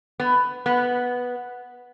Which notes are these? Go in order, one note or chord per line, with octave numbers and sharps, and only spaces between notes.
B3
B3